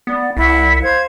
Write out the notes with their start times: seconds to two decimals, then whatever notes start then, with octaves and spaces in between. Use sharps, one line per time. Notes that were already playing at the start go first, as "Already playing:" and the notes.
0.07 B3 D5
0.37 C2 E4 F#5
0.81 C5 F5 G#6